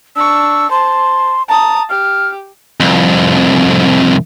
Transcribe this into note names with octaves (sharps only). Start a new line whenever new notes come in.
D4 C#6 E6
C5 A5 C6
A5 A#5 D#6
G4 F6
C2 F2